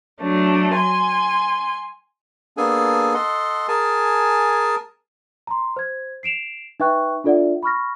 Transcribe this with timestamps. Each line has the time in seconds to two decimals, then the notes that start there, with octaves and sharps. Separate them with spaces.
0.21 F#3 A3 D4
0.75 G#5 C6
2.57 A#3 B3 D4 G#4 A4 G#5
3.14 A4 D#5 F#5 C6
3.68 G#4 A#4 G#5 A5
5.47 A#5 C6
5.76 C5 G#6
6.23 C7 D7 E7 F7
6.80 D#4 B4 E5 G5 C#6 F#6
7.24 D4 F4 A4 D5 E5 F#5
7.63 B5 C#6 F6 A#6